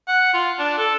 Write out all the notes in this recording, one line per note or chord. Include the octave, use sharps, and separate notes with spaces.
F#5
F4
D4
A4